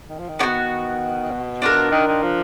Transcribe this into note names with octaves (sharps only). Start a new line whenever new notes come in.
D#3
F3
D#3
B3 D4 F#4
B2
D4 F4 A#4
D#3
D#3
F3